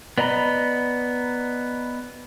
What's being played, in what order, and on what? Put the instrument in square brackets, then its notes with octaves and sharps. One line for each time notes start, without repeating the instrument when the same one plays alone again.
[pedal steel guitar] B3 D5 D#5 A#5 B5